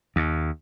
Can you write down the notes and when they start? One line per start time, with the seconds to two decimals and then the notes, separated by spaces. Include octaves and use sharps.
0.16 D#2